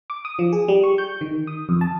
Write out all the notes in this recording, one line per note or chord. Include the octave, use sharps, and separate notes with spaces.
D6
D#6
F3
G#4
G3
C#6
G6
D#3
D#6
F2
A5